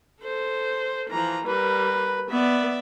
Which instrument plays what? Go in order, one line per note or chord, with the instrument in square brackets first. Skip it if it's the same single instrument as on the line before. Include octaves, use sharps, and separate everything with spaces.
[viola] A4 C5
[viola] E3 F3 [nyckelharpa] A#5
[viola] G3 A#4 [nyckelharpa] B4
[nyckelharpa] B3 [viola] D5 E5